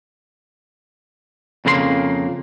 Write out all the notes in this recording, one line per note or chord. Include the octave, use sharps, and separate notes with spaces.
F2 C#3 A#3 A4 C6